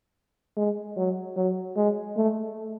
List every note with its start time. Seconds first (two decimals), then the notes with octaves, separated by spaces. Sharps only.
0.57 G#3
0.96 F#3
1.36 F#3
1.76 G#3
2.16 A3